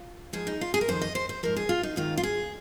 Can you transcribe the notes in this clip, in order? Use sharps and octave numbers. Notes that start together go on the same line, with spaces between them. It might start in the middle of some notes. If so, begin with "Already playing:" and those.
Already playing: F4
G#2 F3 G#4
D#4
F4
G#4
A#4
F2 D#3 C5
D#5
C5
C5
G#2 F3 A#4
G#4
F4
D#4
G#2 D#3 F4
F4
G#4